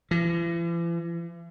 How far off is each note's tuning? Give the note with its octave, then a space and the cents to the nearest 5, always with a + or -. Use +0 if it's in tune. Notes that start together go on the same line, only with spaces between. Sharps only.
E3 +45